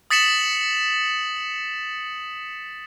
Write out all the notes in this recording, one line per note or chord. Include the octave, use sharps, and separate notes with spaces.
D#6 A6 B6 C#7 E7 F#7